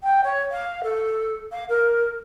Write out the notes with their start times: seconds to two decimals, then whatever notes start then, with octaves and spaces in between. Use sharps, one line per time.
0.03 G5
0.24 C#5
0.51 F5
0.83 A4
1.52 F5
1.69 A#4